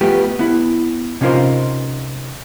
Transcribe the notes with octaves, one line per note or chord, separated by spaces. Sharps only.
A3 B3 F4 G4 G5
B3 E4
C3 C#4 D#4 F4 A#4 C5